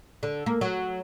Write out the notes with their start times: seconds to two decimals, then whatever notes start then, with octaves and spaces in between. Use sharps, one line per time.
0.23 D3
0.46 A#3
0.61 F#3